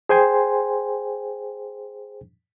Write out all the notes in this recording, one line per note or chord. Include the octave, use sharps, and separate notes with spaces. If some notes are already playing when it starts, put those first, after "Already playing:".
G#4 C5 G5 G#5 C6